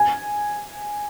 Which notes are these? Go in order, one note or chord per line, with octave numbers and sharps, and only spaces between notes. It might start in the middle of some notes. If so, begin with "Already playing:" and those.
Already playing: G#5